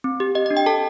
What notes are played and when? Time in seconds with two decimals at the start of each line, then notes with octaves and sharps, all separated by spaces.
0.04 C4
0.20 G4
0.35 G4 D#5
0.46 D#5
0.51 D4
0.57 G5
0.66 A4 A5